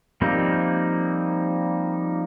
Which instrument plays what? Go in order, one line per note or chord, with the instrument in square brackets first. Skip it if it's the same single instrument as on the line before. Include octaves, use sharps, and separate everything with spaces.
[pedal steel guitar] F3 G3 A#3 C4 D#4